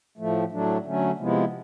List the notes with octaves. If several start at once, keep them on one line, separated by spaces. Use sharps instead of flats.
A2 F3 A3
A2 F#3 A3 D4
D3 F#3 A3 C#4
C3 F3 G#3 B3 E4